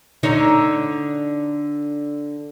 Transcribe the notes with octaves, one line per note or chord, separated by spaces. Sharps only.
D3 D#4 C#5